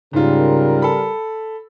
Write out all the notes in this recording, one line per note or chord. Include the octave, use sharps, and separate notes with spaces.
G#2 C#3 G3 F4 A#4
A4 B5